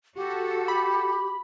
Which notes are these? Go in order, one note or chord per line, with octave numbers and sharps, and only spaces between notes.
F#4 G4 A4
B5